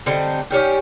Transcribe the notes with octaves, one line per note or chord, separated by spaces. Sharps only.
D3 G3 C4 D#4
D#3 G3 C#4 G4